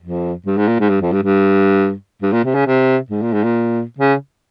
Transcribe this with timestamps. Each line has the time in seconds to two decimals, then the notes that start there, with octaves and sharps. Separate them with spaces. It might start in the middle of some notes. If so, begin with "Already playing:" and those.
0.03 F2
0.46 G2
0.57 G#2
0.68 A#2
0.80 G#2
0.90 G2
1.01 F2
1.12 G2
1.23 G2
2.22 G2
2.33 A#2
2.44 C3
2.55 C#3
2.67 C3
3.11 G#2
3.22 A#2
3.33 G#2
3.44 A#2
3.99 C#3